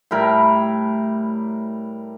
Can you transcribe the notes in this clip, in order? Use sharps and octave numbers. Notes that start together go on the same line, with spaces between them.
A2 G3 A#4 B5